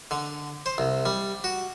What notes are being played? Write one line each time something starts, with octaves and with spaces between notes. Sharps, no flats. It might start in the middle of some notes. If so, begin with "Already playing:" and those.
D3
C5
C2
G3
F#4